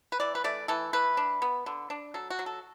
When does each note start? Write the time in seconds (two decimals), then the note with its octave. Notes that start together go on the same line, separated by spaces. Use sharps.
0.12 B4
0.20 E3 D5
0.35 B4
0.44 A3 D5
0.68 E3 A4
0.93 E3 B4
1.17 D4
1.42 B3
1.66 D3
1.90 D4
2.14 F#3 A4
2.30 F#4
2.39 F#3
2.46 A4